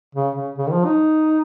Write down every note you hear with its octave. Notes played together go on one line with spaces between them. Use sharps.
C#3
C#3
C#3
D#3
F3
D#4